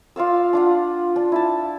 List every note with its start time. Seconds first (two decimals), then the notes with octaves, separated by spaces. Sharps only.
0.16 F4 D5 F5 E6
0.53 D4 F4 F#5
1.16 D4
1.32 E4 A5